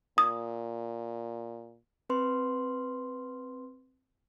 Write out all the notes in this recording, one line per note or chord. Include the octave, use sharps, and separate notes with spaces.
A#2 D#6
C4 B4 C6